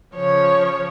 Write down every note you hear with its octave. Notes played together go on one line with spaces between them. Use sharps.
C#3 F3 C#5